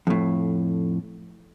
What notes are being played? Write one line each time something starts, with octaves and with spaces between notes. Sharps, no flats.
F2 A2